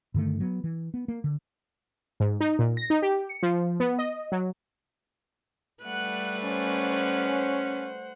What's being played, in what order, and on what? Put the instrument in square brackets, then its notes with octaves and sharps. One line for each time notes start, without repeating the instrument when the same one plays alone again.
[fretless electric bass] G2 D3 D#3 A3
F#3 B3
E3
B3
A#3
D3
[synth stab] G#2
D#4
A#2
A#6
D#4
G4
C#7
F3
B3
D#5
F#3
[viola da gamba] G3 A3 B4 [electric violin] F#5 F#6
[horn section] C#4 [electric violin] C5 F#5